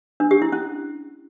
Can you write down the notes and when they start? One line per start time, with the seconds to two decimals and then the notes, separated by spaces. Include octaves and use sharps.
0.20 D4
0.31 G4
0.42 E4
0.52 C#4